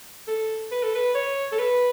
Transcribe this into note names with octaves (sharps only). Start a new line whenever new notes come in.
A4
B4
A4
B4
C#5
A4
B4